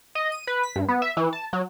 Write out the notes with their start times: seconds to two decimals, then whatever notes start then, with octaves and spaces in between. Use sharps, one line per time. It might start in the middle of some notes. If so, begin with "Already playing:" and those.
0.15 D#5
0.32 D#7
0.47 B4
0.63 B6
0.76 G2
0.88 B3
1.02 E5
1.17 E3
1.33 A5
1.53 F#3